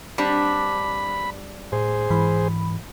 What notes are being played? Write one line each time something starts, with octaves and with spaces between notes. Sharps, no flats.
G3 C4 D4 B5
A2 G#4 C5
G#2 E3 B5